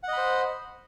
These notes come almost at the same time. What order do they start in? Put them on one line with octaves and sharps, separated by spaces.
F#5 D#5 B5 C5